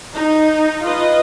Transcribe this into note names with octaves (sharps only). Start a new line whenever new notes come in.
D#4
F4 B4 D#5